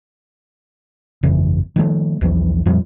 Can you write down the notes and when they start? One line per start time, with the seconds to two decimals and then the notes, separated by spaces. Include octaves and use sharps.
1.23 G1 F2 C#3 E3
1.76 D#3 F3 A3
2.21 B1 E2 E3 F3
2.66 F2 A#2 F3 G3